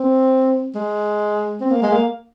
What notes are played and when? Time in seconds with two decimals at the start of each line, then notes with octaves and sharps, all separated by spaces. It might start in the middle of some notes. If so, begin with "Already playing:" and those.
Already playing: C4
0.75 G#3
1.61 C4
1.71 A#3
1.82 G#3
1.92 A#3